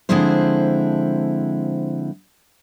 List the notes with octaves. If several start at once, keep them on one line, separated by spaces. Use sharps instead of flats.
D3 F3 G#3 C4 E4 C5